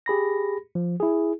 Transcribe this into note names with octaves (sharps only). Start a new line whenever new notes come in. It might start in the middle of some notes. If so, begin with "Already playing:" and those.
G4 G#4 B5 A#6
F3
E4 G#4